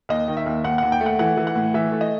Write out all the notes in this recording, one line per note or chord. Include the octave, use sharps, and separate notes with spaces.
D#2 D#5
D#3
E5
D#2
D#2 F#5
D#2 F#5
G5
A3
F#5
E3 F#5
E3
F#5
A2
E3 E5
A3
D#5